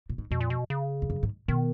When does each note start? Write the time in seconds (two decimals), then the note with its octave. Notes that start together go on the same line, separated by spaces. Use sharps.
0.10 A#2
0.18 G#2
0.31 F2 B2
0.41 A#2
0.50 B2
0.70 C#3
1.02 F2
1.10 F#2
1.23 G#2
1.48 B2 D#3